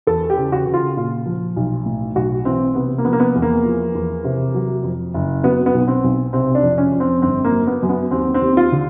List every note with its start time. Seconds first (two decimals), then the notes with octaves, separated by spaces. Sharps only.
0.07 E2 A4
0.30 G4
0.38 C#3
0.52 F#4
0.66 C#3
0.74 F4
0.97 A#2 F4
1.26 F3
1.56 B1
1.86 A2
2.15 B1 F#4
2.45 E3 C4
2.75 C3 B3
2.98 A#3
3.05 F3 B3
3.13 A#3
3.20 B3
3.35 E2
3.42 A#3
3.65 F3
3.95 E2
4.24 C3
4.54 F#3
4.84 F2
5.14 F#1
5.43 F#3 B3
5.66 B3
5.74 B1
5.88 C4
6.04 B1
6.33 C3 C4
6.55 D4
6.63 F2
6.78 C#4
6.92 F2
7.00 C4
7.22 G1 C4
7.44 A#3
7.52 F#2
7.67 B3
7.83 F#2
7.89 B3
8.11 D#2 C4
8.34 C4
8.41 D#2
8.57 F4
8.72 D3